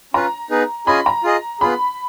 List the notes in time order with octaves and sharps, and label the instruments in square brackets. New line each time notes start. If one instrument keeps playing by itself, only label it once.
[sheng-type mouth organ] C#4 F4 B4 [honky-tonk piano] A#5
[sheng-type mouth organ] B3 D#4 G#4 B4
[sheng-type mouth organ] C#4 F4 G#4 D#5 G#5 [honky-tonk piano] B5
[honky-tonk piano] A#5
[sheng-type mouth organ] F4 G#4 D#5
[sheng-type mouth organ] B3 F4 G#4 [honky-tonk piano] B5